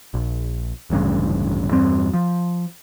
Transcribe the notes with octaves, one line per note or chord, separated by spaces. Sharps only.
A#1
D1 A1 G2 C#3
E2 G2 C4
F3